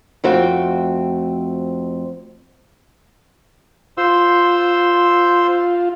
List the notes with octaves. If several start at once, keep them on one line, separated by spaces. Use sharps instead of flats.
F2 A3 C4 F#4 G5
F4 C5 C6 E6